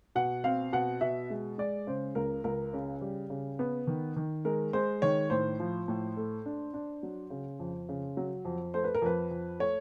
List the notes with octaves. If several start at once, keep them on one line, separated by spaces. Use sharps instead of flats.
B2 F#5
C4 F5
B2 F#5
B2 E5
G#3
G#3 D5
C#3 C5
C#2 A#4
C#2 A#4
C#3
G3
C#3
B3
D#3
D#3
G#3 A#4
G#3 C5
D#3 C#5
A2 C5
F3
A2
A3
D4
D4
F#3
C#3
F2
C#3
F#3
F2
A3 C5
B4
A#4
F2 B4
F2
A3 C#5